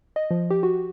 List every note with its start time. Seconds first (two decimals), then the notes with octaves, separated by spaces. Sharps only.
0.16 D#5
0.31 F3
0.51 G4
0.63 F#4